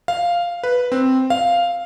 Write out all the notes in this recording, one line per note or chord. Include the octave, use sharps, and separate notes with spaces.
F5
B4
C4
F5